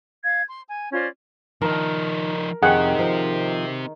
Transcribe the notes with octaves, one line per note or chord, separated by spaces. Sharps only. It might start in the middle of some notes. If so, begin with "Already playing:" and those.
F5 G#6
C6
G#5
C#4 F4 C5 D5
D#3 F3 D#4 A#4
F2 D#3 C4 G4 G#4 F#5
F3